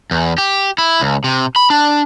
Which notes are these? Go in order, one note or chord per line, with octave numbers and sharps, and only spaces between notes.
E2
G4
E4
C#2
C3
B5
D4